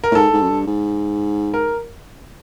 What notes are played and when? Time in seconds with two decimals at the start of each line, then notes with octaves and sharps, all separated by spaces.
0.04 A#4
0.11 A2
0.15 G#2 A4
0.33 G#2
0.42 F#2
0.50 G2
0.67 G#2
1.54 A#4